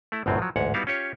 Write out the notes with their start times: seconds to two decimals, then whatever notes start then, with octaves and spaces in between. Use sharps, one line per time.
0.12 A3 E4
0.26 G1 C2 F#2 A2 F#3 C4
0.39 F3 F#3
0.56 A1 D2 G#2 C#5 F#5
0.74 G3 B3 D#4 E4 F#4 F5
0.87 C#4 F4 G4 C#5